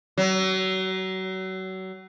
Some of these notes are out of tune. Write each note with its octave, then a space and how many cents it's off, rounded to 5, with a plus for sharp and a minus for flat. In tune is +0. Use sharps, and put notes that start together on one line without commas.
F#3 +30